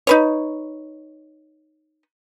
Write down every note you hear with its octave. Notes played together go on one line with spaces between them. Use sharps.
D#4 B4 C#5